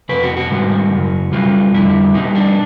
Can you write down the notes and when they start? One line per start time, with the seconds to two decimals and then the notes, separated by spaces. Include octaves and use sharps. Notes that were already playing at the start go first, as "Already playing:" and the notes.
0.09 F2 C3 B4
0.23 F#4
0.37 F#4
0.50 G#2 D#3 G3
0.92 F#2 C#3
1.32 B2 G3 F4
1.73 F2 D3 G3 E4
2.14 B2 G3 D#4
2.35 D4